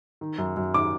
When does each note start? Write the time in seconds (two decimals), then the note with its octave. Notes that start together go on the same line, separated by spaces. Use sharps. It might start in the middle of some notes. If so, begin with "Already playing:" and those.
0.21 D#3
0.38 F#2
0.57 F#2
0.74 D#3 D6